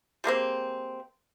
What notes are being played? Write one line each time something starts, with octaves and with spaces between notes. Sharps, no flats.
G3 G#3 A#3 C4